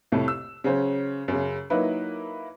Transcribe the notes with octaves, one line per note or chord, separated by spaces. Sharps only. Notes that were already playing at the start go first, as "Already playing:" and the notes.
C2 F2 A2 A3
E6
C#3 F#3 C#4 C5
F#2 C#3
F#3 A#3 D#4 E4 B4